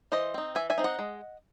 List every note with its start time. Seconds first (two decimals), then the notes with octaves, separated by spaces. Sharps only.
0.12 E3 C5 D#5
0.34 C4 D#4
0.55 E3 E5 G#5
0.70 E5 G#5
0.78 C4 D#4
0.84 D#5 F#5
0.99 G#3